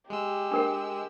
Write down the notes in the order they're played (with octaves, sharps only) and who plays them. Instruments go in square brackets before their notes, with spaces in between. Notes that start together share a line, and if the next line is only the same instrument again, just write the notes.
[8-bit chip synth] G#3 E6 [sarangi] G4
[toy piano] D4 A#4 G5